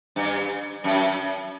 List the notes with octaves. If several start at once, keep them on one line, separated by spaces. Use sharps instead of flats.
G2
F#2